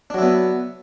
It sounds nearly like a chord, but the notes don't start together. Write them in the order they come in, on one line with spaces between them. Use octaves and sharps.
D4 F#3 E4 B3